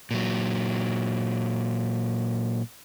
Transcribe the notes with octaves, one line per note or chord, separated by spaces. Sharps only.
A#2 F#3